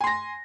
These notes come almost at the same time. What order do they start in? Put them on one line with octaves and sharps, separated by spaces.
G#5 C6 A#6